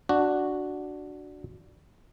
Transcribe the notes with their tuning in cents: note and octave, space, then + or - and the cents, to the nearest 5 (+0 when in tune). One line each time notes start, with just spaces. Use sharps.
D4 +0 F#4 +0